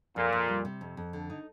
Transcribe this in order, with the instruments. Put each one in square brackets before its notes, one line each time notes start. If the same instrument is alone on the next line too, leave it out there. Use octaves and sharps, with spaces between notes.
[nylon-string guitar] F2 [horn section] A#2
[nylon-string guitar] F2
G3
C3
F2
F2
D3
D#4